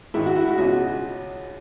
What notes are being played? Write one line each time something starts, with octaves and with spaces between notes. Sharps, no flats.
G#2 D#3 E4
F#4
E4
F#4
C#2 B2 F#4